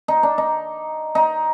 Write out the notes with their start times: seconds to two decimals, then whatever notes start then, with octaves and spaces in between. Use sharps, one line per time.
0.08 D#4
0.23 D4
0.38 D#4
1.15 D#4